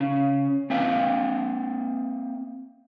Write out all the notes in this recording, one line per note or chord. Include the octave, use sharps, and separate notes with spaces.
C#3
A#3 C4 E5 F5 G5